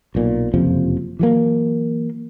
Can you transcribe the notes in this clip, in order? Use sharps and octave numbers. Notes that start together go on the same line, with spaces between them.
B1 A#2
F#1 F2 C3 F3
E3 F#3 A#3